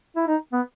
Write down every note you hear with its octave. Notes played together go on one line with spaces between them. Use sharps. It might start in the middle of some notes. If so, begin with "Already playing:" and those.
E4
D#4
B3